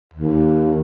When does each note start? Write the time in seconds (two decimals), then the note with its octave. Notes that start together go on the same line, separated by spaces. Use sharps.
0.14 D#2